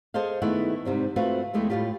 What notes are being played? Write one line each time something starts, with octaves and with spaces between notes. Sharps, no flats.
G#4 A4 C5 D#5 F5
D#3 A3 B3 E4 G#4 F#5
G#2 C3 G3 C4
A3 C4 F4 F#4 B4
E2 G#3 A3 E4 G#4 G5
A2 G3 D4 F4 G4